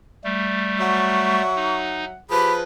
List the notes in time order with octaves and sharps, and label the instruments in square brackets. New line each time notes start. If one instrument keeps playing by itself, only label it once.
[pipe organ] G3 A3
[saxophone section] F#3 E5 F#5 [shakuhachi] C#6
[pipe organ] D#4
[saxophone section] F3 G#4 B4 [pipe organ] G4 [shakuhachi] B5